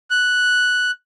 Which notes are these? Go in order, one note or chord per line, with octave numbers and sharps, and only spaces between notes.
F#6